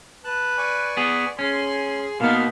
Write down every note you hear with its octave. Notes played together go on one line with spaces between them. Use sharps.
B4 A5 F#6
D5 G#5 C#6
B3 G#4
C#4 G#4 G#5 C6
B2 A#3 B3 D#4 F5 A5 C6 F6